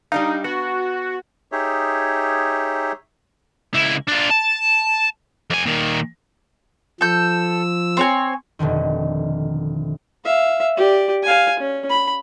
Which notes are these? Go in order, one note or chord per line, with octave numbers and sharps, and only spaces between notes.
G3 D4 D#4 F5
B3 F#4
D#4 G4 G#4 C#5 E5
C#2 E4
D4 F4
A5
F2 G#5
A#2 D#3
F3 A4 E6 G6
C4 C#5 G#5
F1 B2 D3 D#3
E5 F5
G4 D5
F5 G#5
C#4
B5